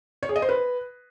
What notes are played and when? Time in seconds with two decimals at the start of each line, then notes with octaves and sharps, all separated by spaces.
0.23 C#5
0.29 G#4
0.36 D#5
0.42 C5
0.49 B4